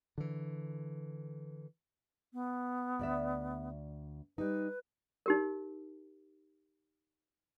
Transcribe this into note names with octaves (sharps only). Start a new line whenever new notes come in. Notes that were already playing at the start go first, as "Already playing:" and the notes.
D3 E3
B3
D2 D5 E5
G3 D#4 B4
D#4 G4 A#4